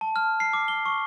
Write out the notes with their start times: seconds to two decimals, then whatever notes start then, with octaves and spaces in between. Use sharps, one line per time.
0.01 A5
0.16 F6
0.40 C7
0.53 D6
0.68 G7
0.86 C#6